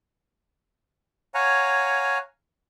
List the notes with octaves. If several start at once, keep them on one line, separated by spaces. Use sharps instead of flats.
C#5 F5 F#5 G#5 A#5